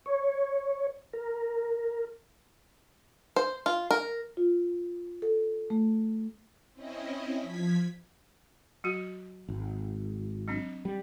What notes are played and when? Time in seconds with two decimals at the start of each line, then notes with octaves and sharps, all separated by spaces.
0.06 C#5
1.13 A#4
3.36 C5
3.66 F4
3.91 A#4
4.37 F4
5.22 A4
5.70 A3
6.73 C4 C#4 E4 D#5
7.38 F3 G#6 B6
8.84 F#3 F#4
9.48 G#1
10.48 F#3 C4 D4
10.85 G3